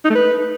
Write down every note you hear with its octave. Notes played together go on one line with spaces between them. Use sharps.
D#4
A3
B4